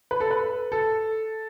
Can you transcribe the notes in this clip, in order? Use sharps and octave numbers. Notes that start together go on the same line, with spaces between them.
B4
A4
B4
A4